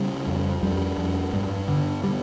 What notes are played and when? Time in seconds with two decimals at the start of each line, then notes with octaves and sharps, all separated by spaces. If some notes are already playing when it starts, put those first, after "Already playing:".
Already playing: C#3 G3
0.28 F2
0.63 F2 G3
0.98 F2
1.33 G2
1.68 D3
2.03 D3 G3